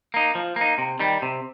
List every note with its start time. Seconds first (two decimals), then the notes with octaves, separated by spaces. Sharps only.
0.14 A#3 D#4
0.35 F3
0.56 A#3
0.61 D#4
0.78 C3
0.99 D#3 G3
1.22 C3